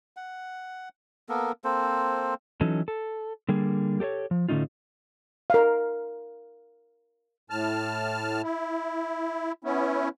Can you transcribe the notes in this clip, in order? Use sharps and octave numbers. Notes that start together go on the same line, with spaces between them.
F#5
A#3 B3 A4 A#4
A#3 C4 A4 C5
E3 F#3 C#4 D#4 A4
A4
D3 G3 A#3 G#4
G4 A4 C5 C#5
F3
A2 D3 A3 C#4 D#4 F4
A#4 F5
A2 A5 F6
E4
B3 C#4 E4